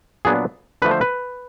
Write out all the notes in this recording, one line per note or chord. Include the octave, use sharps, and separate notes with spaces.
A#2 F#3 B3 D4 G#4
D3 F3 A3 B4
C5
B4